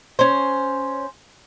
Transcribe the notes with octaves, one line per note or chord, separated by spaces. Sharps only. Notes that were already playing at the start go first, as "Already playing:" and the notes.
C#4 C5